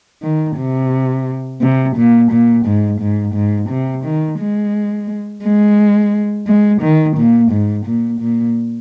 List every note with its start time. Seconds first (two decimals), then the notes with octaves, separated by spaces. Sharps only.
0.23 D#3
0.57 C3
1.61 C3
1.96 A#2
2.31 A#2
2.66 G#2
3.01 G#2
3.34 G#2
3.70 C3
4.04 D#3
4.39 G#3
5.43 G#3
6.47 G#3
6.82 D#3
7.17 A#2
7.51 G#2
7.86 A#2
8.21 A#2